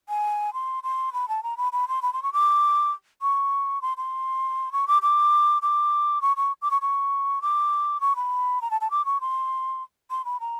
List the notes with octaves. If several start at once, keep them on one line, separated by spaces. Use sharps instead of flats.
G#5
C6
C6
B5
A5
A#5
B5
B5
C6
B5
C6
C#6
D6
C#6
C6
C6
C#6
D6
D6
D6
C#6
C#6
D6
C#6
C#6
D6
C#6
B5
A#5
A5
A5
D6
C#6
C6
C6
B5
A#5